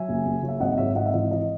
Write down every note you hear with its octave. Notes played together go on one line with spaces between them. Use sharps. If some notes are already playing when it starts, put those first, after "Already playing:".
Already playing: F#3 E5 G#5
F#1
F#1
F#3
E5
G#1 D#5 F#5
G#2 C#5 E5
G#1 D#5 F#5
E5
E3 D#5
E3 D#5